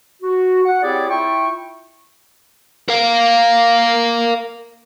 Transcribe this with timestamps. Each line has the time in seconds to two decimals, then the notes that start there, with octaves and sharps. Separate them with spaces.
0.22 F#4
0.65 F#5
0.83 C4 E4 G4 G#4 C#5 D5
1.10 E4 F4 E5 G5 C#6
2.89 A#4 F5